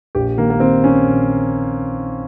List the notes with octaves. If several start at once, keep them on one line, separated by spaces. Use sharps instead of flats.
A#1 G4
D#3 A#3
A#3
D#3 C4
A#1 C#4
A#1